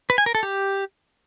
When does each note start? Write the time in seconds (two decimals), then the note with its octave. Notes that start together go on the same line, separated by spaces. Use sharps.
0.10 B4
0.18 G#5
0.26 A#4
0.35 A4
0.43 G4